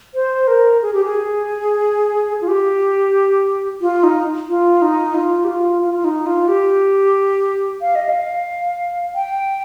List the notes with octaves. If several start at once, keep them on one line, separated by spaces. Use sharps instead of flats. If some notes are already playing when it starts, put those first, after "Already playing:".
C5
A#4
G#4
G4
G#4
F4
G4
F4
D#4
F4
D#4
F4
G4
F4
F4
F4
D#4
F4
G4
F5
D#5
F5
G5